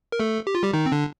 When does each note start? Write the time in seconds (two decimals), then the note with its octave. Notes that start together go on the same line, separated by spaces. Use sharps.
0.12 A#4
0.20 A3 A4
0.47 G4
0.55 F4
0.63 G3 G4
0.73 D#3 D#4
0.86 C4
0.92 D3 D4